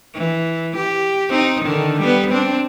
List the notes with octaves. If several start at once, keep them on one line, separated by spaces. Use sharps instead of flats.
E3
G4
C4 D#4
D3 D#3
G3 B3
C4 D4